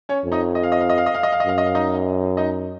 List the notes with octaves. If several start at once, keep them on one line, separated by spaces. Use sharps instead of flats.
C#4 C#5
F2
D#4 D#5
D#5
F5
D#5
F5
D#5
F5
D#5
F5
D#5
F5
D#5
F#2 F5
D#5
F5
D#4 D#5
D#4 D#5